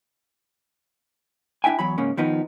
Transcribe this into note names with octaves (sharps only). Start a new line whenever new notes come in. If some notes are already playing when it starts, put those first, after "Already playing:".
D4 E4 E5 G5 G#5
E2 F#3 C#5 B5
G#2 C#3 A#3 C#4
D#3 F3 B3 D#4